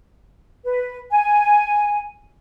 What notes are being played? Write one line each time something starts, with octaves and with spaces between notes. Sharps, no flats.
B4
G#5